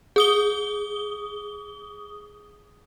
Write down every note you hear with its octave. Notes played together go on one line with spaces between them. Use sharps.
G#4 D#6 G7